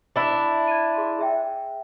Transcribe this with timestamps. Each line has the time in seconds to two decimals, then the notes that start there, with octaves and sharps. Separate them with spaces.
0.16 D4 E4
0.68 G#6 D#7
0.95 G#4 C6
1.19 G#4 E5 G5